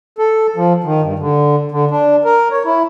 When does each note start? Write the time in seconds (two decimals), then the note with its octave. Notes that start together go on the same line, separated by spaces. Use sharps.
0.18 A4
0.56 F3
0.84 D#3
1.02 G2
1.19 D3
1.72 D3
1.91 D4
2.25 A#4
2.51 C#5
2.65 E4